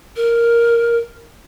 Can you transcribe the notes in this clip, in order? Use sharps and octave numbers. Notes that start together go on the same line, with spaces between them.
A#4